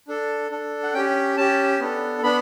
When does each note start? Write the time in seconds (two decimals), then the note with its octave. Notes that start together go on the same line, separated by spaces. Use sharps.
0.08 D4 A4
0.51 D4 A4
0.83 F#5
0.94 C#4 G5
0.97 G4
1.37 C#4 G4 A5
1.80 B3 D4 A4
2.23 B3 D4 B5